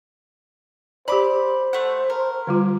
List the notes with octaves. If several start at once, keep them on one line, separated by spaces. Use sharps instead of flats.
G4 C5 D5 B5 D6
A3 F#5
A#4
D3 G3 F4